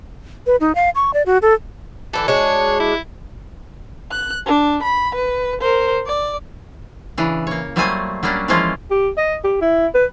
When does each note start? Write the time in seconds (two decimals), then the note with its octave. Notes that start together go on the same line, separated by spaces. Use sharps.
0.47 B4
0.60 D#4
0.75 F5
0.95 C#6
1.14 D5
1.26 F#4
1.42 A4
2.13 D3 E3 D4 A4
2.28 G#3 D4 F#4 C#5
2.80 E4
4.11 F#6
4.46 D4
4.83 B5
5.15 B4
5.61 A#4 C5
6.06 D5
7.18 C#3 E3 D4
7.47 A#3 C#5
7.76 F#3 G3 A3 A#3 C5 G#5
8.23 F#3 G3 A#3 C#4 D4
8.48 E3 F3 G#3 A#3 C#4 F4
8.91 G4
9.18 D#5
9.44 G4
9.62 E4
9.95 B4